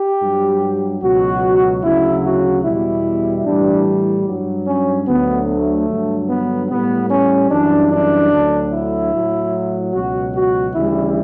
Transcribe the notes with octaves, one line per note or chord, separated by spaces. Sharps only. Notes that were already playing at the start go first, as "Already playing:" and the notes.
Already playing: G4
G2 F#3
C#2 B2 F#3 F#4
D2 C#3 F#3 E4
F#4
E2 B2 G3 E4
A2 E3 G3 D4
G2 F#3
C#4
D2 D3 F#3 B3
A3
G2 D3 F#3
B3
A2 G3 B3
C#4
F#2 E3 G3 D4
D4
D2 D3 F#3
E4
A2 F#3
C#2 B2 F#3 F#4
F#4
D2 C#3 E3 G3 E4